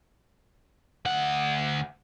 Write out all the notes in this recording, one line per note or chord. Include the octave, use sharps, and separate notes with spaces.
D2 F#5